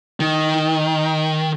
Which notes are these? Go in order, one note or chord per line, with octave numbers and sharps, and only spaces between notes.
D#3